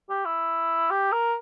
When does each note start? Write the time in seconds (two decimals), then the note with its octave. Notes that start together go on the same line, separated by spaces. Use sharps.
0.10 G4
0.25 E4
0.90 G4
1.12 A#4